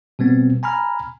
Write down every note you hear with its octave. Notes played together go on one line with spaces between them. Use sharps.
B2 G3 B3 C4
G#5 A#5 B5 F6